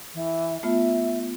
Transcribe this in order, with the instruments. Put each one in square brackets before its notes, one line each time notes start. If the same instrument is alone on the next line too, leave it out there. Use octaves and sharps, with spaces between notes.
[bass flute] E3
[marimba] A3 B3 F4 [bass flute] E5